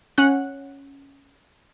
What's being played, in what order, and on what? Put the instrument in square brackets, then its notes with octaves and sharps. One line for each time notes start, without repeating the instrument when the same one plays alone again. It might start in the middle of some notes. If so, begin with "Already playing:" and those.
[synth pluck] C#4 F#5 F#6